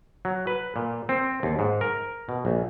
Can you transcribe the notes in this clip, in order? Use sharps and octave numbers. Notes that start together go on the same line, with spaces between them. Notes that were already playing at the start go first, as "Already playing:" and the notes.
F#3
B4
A#2
C4
D#2
G#2
A#4
B2
A#1